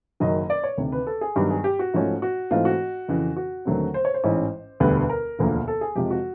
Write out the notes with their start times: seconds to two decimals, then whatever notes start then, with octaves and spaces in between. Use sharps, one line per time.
0.20 F#1 F#2 D#3 F#3 D#5
0.50 D5
0.64 C#5
0.78 D2 C3 D#3
0.92 B4
1.07 A4
1.21 G#4
1.36 G2 D#3 F#3 B3 G4
1.50 G#4
1.64 G4
1.79 F#4
1.94 G#2 F3 A3 C#4
2.22 F#4
2.51 G#2 E3 A3 C4 F4
2.65 F#4
3.08 F2 C#3 E3
3.36 F#4
3.65 D#2 D3 F#3 A3 C4
3.94 C5
4.05 C#5
4.14 C5
4.24 A1 G#2 E3 G#3 C#4
4.80 E1 D2 D3 G3 B3 B4
4.96 B4
5.09 A#4
5.39 E1 D2 D3 F3 A#3
5.68 A4
5.81 G#4
5.95 F2 C3 F3 G#3 G4
6.11 F#4